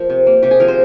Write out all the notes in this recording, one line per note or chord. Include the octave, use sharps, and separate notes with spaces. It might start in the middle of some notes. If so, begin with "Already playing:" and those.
Already playing: F3 A#3 C5
C3
A#3
C3 G4
G#4
F3 A#4
C5